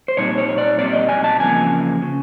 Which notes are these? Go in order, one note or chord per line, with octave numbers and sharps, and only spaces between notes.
C5
A#2 G3 C4 D#4 C#5
C#5
D5
A#2 G3 C4 D#4 D5
D#5
G#5
A5
E2 C#3 F3 A#3 G#5
C#3